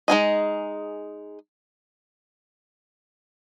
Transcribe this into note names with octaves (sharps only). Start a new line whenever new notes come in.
G#3 D#4 G#4 D#5